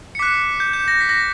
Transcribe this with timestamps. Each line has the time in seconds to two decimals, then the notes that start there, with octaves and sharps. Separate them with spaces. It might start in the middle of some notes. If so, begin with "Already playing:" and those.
0.15 C#7
0.19 D6 F#6 B6
0.60 G6
0.73 G6
0.88 A#6
1.01 B6
1.09 A#6